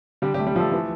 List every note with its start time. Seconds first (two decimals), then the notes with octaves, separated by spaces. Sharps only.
0.22 D3 G3 G4
0.34 G3 G4
0.39 A3
0.47 G3 G4
0.56 F3 A3 A4
0.72 E3